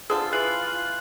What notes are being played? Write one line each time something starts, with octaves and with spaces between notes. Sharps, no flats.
D3 C4 F4 G#4 A4
E3 F#6 C7 F#7